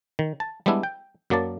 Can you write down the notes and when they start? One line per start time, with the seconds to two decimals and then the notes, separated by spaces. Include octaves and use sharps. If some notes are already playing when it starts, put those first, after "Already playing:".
0.19 D#3
0.40 A5
0.66 G3 G#3 B3 D4 E4
0.83 G5
1.30 F#2 F#3 A#3 D5 A5